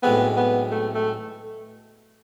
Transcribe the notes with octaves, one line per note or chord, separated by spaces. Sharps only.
B1 A2 G#3 B3 C4
B3
A3
A3